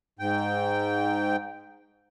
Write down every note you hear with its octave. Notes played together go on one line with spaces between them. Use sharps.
G#2 G5